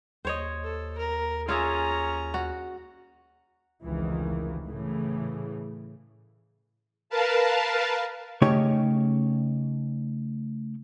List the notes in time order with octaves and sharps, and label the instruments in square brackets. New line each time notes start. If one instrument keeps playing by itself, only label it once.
[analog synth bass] D#2 [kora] C5 C#5 D#5
[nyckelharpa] A4
A#4
[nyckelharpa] C#4 A#5 [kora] F4 G#4 E5
[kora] F#4
[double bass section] F1 C#2 D#3 E3
A2 C#3 E3
[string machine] A#4 B4 F5 A5
[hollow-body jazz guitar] C#3 A3 C#4 D#4 G4 C#5